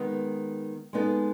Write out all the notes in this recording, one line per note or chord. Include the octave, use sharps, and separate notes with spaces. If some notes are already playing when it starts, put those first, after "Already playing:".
Already playing: D#3 G#3 B3
G#3 B3 D#4 A4